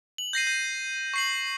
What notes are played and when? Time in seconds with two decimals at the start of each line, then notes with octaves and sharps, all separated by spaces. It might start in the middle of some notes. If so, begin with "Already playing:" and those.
0.18 F#7
0.33 G6 A#6 C7 D#7
0.47 G6 D#7
1.14 C#6 C7 F#7